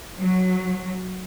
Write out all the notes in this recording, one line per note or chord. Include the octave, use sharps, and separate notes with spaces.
F#3